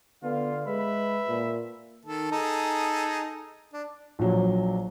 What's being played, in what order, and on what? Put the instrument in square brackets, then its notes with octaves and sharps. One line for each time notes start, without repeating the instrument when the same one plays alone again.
[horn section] D3 F5 [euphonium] B3 [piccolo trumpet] F4
[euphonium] G#3 [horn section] B4 B5 [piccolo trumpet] E5
[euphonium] A#2
[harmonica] D#3 A4
D#4 G#4 A4
D4
[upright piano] A#1 F#3